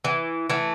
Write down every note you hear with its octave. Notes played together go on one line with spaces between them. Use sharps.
E3
E3 A3